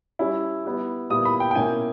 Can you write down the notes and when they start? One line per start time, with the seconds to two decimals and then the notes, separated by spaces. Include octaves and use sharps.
0.19 G3 C#4 E4
0.65 G3 B3 E4
1.10 A#2 G3 B3 E4 D#6
1.25 B5
1.40 G5
1.51 G5
1.55 B2 A#3 C#4 E4 G#5